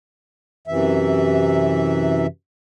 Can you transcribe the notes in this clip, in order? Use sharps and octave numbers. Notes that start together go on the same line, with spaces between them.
F#2 C3 E3 E5